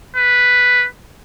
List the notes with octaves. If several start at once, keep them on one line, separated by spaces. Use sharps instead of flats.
B4